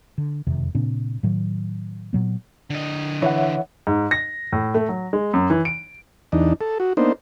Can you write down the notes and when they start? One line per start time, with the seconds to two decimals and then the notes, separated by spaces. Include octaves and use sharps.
0.18 D3
0.47 E1 F2 C3 D#3
0.75 A#2 C#3 C4 D4
1.23 A2 D#3 F#3
2.13 A#2 F#3 B3
2.70 D3 D#5
3.22 E3 C#5 E5 F#5
3.87 G#2
4.11 A#6
4.52 A2
4.74 A3
4.89 F#3
5.13 G#3
5.33 F#2
5.50 E3
5.65 D7
6.32 E2 D4 D#4
6.61 A4
6.80 F#4
6.97 A#3 B3 D4 D#4 C5